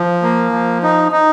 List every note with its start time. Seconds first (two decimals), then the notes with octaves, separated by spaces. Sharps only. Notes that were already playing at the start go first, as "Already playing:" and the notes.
Already playing: F3
0.23 A#3
0.52 F3
0.83 D#4
1.12 D#4